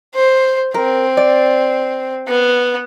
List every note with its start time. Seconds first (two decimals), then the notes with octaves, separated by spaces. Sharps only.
0.14 C5
0.74 C4 A#4
1.17 D5
2.28 B3